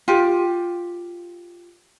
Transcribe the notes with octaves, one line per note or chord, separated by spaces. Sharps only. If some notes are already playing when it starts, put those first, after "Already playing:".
F4 G4